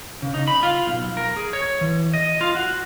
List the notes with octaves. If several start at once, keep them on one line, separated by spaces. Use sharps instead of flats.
C#3
D#4
B5
F4
B1
A#4
G#4
C#5
E3
D#5
F4
F#4